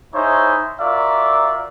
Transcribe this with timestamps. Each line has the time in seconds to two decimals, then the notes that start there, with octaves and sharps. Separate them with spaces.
0.14 D#4 E4 G#4 C5 C#5 E5
0.81 F4 F#4 A#4 D5 E5 F5